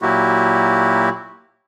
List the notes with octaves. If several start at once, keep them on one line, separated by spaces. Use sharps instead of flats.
A#2 F#3 A#3 E4 F#4 G4